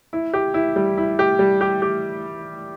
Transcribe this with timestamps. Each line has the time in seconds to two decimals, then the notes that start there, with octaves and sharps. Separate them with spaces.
0.13 E4
0.34 G4
0.54 E4
0.76 G3
0.98 E4
1.19 G4
1.39 G3
1.61 G4
1.82 G4